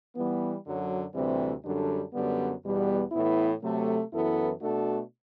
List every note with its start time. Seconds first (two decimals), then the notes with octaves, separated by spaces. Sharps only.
0.16 E3 G3 B3
0.64 F#2 D3 F#3
1.14 D2 C3 E3 G3 C4
1.64 F#2 D3 G3 D4 A4
2.13 F#2 D3 G3 B3
2.63 E2 B2 G3 B3
3.12 A2 E3 B3 E4
3.62 C3 F#3 A3
4.12 F#2 E3 B3 E4 A4
4.61 B2 A3 D4 F#4 A4